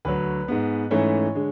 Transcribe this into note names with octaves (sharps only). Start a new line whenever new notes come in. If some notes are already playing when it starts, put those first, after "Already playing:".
D2 D3 F#3 B4
G#2 G#3 B3
G#2 E3 A3 C#4 C#5
D3 G#3